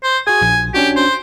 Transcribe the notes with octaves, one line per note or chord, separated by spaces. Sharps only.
C5
F#4 G#4 G#5
A#1
C#4 D4 F#4 G4
C5